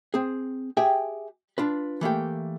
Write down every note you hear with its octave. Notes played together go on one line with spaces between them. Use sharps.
C4 G#4
G4 G#4 E5 G5 G#5
D4 F4 B4
E3 A3 A#3 G4